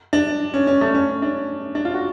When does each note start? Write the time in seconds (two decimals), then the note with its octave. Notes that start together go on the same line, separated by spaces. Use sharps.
0.13 D4
0.54 C#4
0.67 C#4
0.81 A3
0.94 C#4
1.22 D4
1.75 D4
1.85 F4
1.94 F#4